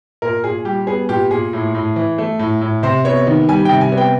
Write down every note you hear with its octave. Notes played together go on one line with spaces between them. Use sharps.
A#2 A#4
A#2 G#4
G3 G4
B3 G#4
A#2 G4
A#2 G#4
A2
A2
E3
A3
A2
A2
C3 C5
B3 C#5
D#3
G3 G#5
C3 G5
G#5
B3
G5